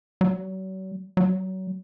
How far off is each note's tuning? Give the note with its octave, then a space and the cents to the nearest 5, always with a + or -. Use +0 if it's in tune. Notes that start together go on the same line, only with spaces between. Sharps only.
F#3 +40
F#3 +25